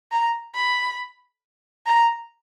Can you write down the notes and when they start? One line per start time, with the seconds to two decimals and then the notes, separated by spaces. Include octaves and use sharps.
0.11 A#5
0.55 B5
1.86 A#5